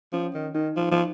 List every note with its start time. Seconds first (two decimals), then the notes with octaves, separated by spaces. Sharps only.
0.13 F3 C#4
0.34 D#3
0.54 D#3 D#4
0.76 F3
0.91 F3